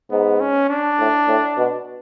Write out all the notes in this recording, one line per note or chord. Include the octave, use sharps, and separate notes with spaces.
G#2 B3
C#4
D4
A2
A2
B2